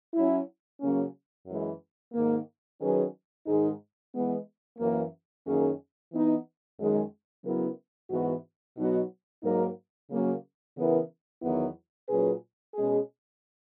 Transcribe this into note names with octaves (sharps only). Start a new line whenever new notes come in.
F#3 C#4 E4
C#3 F#3 A#3 C#4
F#2 E3 G#3
G#2 D#3 A#3
D#3 F#3 C#4 G#4 B4
G#2 D#3 G#3 D#4 G#4
E3 G#3 B3
F#2 E3 A#3
F#2 D#3 A#3 C#4 G#4
E3 B3 D#4
F#2 D#3 G#3
C#3 F#3 B3 E4 A#4
G#2 E3 B3 F#4
B2 F#3 B3 D#4 F#4
G#2 F#3 A#3 D#4 A#4
C#3 F#3 A#3 C#4
C#3 E3 B3 E4 A#4
E2 D#3 F#3 B3 E4
A#2 F#3 C#4 G#4 B4
B2 G#3 C#4 G#4